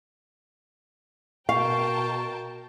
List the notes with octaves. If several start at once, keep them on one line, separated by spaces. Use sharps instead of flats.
B2 A#4 F5 G5 A5 C#6